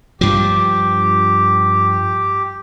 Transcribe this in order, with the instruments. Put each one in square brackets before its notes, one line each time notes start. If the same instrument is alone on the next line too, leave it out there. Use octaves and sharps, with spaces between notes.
[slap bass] G2 F3 [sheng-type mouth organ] G4